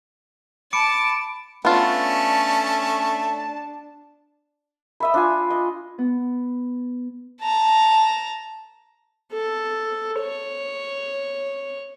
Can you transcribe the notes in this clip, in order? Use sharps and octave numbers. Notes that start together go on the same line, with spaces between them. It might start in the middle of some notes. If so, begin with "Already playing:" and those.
A5 B5 D6 C#7 D7
A3 B3 C#4 D4 F4 A5
D#5 E5 B5
D4 F4 G#5
D#5
B3
A5 A#5
A4
C#5